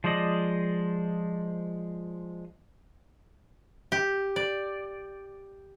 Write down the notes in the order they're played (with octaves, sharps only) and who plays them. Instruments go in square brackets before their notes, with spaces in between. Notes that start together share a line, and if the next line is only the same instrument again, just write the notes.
[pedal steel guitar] F3 G#3 C5 D5 D#5
[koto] G4
D5